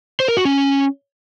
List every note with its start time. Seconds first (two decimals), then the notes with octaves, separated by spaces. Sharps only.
0.20 C5
0.28 A#4
0.37 F#4
0.45 C#4